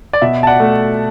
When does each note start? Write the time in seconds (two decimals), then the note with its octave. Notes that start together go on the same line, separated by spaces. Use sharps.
0.13 D5
0.22 B2 E5
0.43 A5
0.47 D5 F#5
0.60 A3